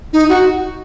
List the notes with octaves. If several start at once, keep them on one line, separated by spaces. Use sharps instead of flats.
D#4
F#4